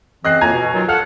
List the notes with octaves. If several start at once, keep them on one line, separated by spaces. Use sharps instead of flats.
C#3 E3 C4 D#5 F#6 C7
A2 A#3 F4 G#5 A#5 G#6
B2
D#3 F#3 F4
A4 F5 F#5 F6